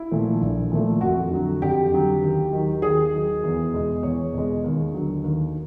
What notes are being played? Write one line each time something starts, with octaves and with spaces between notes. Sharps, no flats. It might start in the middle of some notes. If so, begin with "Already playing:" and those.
Already playing: E4
A#2 F3 A3
A#1
A#2 F3 A3
F2 F#4
D3 F#3
F2 G4
D3 F#3
D#2
D#3 F#3
D#2 G#4
D#3 F#3
E2
B2 G#3
E2 C#5
B2 G#3
D#2
D3 F#3
D#2